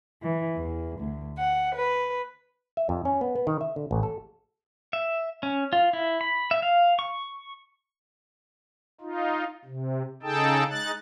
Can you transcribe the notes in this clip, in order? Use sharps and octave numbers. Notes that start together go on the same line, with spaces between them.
E3
E2
D2
F#5
B4
E5
F2
C#4
B3
B3
D#3
E5
D3
A1
A4
E5
C#4
F4
E4
B5
E5
F5
C#6
D#4 F4
C3
C#3 D#4 G#4 A4 G5 A5
G#3 D#4 F#6 A6